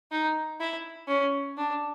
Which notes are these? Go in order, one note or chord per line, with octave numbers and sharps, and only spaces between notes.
D#4
E4
C#4
D4